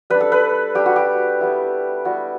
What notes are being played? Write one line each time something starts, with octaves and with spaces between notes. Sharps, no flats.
G3 D4 B4
A4
B4
G3 D4 G4
F#4
G4
G3 B3 E4
G3 B3 E4 F#4